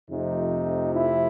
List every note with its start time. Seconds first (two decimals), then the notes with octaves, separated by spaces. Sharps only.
0.11 F2 C3 F3 A3 D#4
0.93 E4